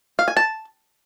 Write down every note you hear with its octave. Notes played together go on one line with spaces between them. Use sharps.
F5
G#5
A5